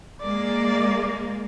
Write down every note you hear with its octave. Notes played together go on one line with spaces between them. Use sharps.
G#3 A#3 D5